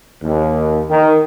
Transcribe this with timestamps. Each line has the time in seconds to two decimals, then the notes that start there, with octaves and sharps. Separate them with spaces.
0.22 D#2
0.89 D#3